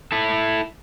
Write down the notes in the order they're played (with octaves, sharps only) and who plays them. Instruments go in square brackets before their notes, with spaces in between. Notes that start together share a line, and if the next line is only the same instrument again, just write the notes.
[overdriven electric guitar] E4 A4